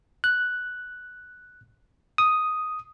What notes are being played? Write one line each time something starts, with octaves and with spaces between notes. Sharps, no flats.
F#6
D#6